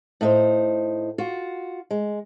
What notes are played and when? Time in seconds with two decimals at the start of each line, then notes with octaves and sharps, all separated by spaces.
0.21 A2 D#4 C5
1.18 F4 F#4
1.91 G#3